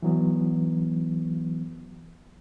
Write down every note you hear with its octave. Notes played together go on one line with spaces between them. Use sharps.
E3 F#3 B3